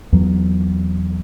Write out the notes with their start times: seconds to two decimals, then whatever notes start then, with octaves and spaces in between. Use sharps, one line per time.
0.13 E2 F#3